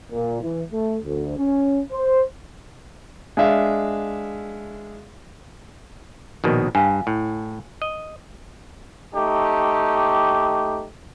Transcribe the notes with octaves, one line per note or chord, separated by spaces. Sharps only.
A#2
E3
A3
D2
C#4
C5
G#3 D4 E5 F5
A#1 B2 D#3
G2 F5 G#5
A2
D#5
A3 D#4 G4